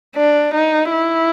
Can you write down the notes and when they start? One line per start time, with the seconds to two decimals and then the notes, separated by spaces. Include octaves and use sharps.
0.16 D4
0.54 D#4
0.92 E4